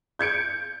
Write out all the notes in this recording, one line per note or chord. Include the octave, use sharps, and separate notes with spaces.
G6 G#6 C#7 D7